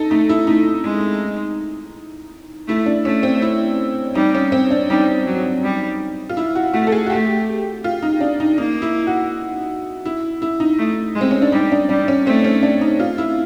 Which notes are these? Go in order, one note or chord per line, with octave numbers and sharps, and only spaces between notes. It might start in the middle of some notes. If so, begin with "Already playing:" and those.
Already playing: D#4 A4
A3 D#4
E4
A3 D#4
G#3
A3 E4
D4
A3 C#4
C4
E4
G3 D#4
C#4
C4
D4
G3 D#4
F#3
G3
F4
E4
F#4
A3 F#4
A4
G#4
F#4
A3 G4
F4
D#4
D4
D#4
A#3 D#4
E4
F#4
E4
E4
D#4
A3
G#3
C4
C#4
D4
G3 D#4
D4
G3 D4
C#4
A3 C4
C#4
D4
D#4
F4
E4